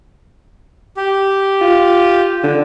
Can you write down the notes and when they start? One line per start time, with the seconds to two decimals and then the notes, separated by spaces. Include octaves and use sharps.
0.97 G4
1.61 F4
2.43 D3